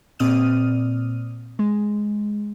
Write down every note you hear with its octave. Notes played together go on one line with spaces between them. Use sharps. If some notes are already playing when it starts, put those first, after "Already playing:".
A#2 C4 D5 D#6 F6 D#7
G#3